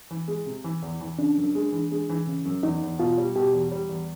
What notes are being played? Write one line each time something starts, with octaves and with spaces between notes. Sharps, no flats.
E3
G#3
C3
E3
E2
E3
C#3 D4
F#2
G#3
E3
G#3
E3
C#3
F#2
E2 D#4
E2
B2 F4
G3
B2 G4
E2
G3
E2